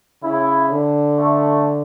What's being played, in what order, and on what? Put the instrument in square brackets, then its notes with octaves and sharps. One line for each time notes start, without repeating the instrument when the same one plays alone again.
[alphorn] C#3 [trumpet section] E4
[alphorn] D3
[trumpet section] A3